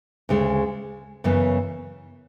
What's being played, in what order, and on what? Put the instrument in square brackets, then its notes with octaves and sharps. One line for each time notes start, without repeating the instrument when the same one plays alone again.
[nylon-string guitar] D2 C#3 G#3
F#2 C#3 E3 B3